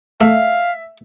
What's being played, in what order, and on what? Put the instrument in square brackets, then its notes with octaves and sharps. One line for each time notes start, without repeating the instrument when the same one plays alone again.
[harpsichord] A3 [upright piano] E5 [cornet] F5